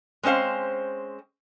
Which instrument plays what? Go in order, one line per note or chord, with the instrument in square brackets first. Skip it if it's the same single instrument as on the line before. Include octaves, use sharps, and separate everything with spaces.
[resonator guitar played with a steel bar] G#3 C4 C#4 C5 F5